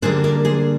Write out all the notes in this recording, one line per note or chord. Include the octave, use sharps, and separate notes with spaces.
D3 G3 A#3 D4 G#4 C5
A#4 D5
G#4 C5